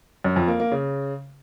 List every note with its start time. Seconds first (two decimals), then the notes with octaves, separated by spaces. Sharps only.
0.24 F#2
0.36 F2
0.48 A#3
0.60 A#3
0.72 C#3